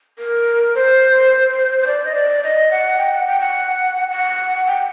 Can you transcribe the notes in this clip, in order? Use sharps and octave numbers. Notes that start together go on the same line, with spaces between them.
A#4
C5
C5
D5
D#5
D5
D#5
F#5
G5
F#5
G5
F#5
F#5
G5